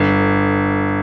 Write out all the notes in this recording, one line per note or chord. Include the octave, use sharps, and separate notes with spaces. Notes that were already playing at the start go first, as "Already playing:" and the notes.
Already playing: G1